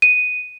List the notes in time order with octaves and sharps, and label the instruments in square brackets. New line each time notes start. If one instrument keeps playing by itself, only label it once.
[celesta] D#7